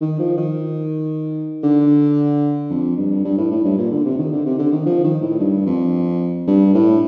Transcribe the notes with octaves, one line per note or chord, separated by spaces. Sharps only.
D#3
F3
D#3
D3
F2
G2
G2
A2
A2
G2
A#2
D3
C3
D#3
D3
C3
D3
D#3
F3
D#3
A2
G2
F2
G2
A2